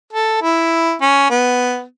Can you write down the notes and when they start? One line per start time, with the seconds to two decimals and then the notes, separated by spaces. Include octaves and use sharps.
0.13 A4
0.42 E4
1.01 C#4
1.30 B3